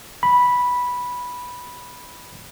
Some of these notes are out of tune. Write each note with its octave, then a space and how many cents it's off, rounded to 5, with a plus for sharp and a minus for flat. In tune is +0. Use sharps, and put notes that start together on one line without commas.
B5 -5